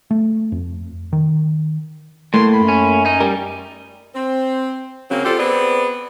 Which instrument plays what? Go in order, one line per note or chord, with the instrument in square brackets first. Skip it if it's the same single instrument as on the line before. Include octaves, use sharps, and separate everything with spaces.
[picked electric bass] A3
F2
D#3
[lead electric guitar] A2 [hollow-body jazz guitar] A3 A#3 [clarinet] C6
[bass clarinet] F#2 [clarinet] B5
[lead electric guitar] C#4
[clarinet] C#4 [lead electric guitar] D#4
[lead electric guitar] G3 [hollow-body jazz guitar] A#4
[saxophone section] C4
C#3 F#3 A#3 C4
F4 G4 A4 C5 D5
B3 C4 G#4 D5